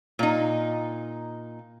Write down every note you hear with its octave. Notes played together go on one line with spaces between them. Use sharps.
A#2 D#4